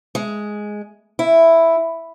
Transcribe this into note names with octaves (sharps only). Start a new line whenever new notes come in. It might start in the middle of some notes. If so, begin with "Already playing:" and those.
G#3
E4